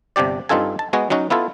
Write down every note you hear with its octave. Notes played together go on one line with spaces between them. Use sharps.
G1 C3 D4 G4 D5
G2 C4 D#4 F4 A4 G#5
A5
G#3 B3 F#4 G#4 D#5
F#3 C#4 D#4 F#4
B3 E4 F4 A4